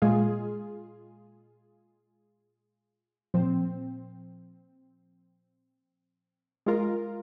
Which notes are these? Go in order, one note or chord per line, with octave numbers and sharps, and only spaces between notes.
A#2 G#3 F4 G#4
A#2 F3 C4
G#3 F4 A#4